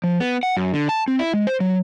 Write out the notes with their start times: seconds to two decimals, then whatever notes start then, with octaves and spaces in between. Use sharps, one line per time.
0.04 F3
0.20 B3
0.43 F#5
0.57 F#2
0.74 D3
0.89 A5
1.08 C4
1.19 E4
1.34 G#3
1.47 C5
1.60 F#3